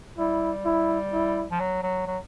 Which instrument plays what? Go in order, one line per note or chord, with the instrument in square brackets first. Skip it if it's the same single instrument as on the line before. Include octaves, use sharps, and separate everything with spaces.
[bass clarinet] G3 [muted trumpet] E4
[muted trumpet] E4
E4
[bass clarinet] F3
F#3
F#3
F#3